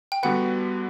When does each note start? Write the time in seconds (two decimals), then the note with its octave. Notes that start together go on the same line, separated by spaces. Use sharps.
0.12 G5
0.23 D3 G3 B3 F#4 B4 F#5